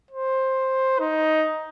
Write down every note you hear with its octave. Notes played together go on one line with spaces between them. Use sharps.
C5
D#4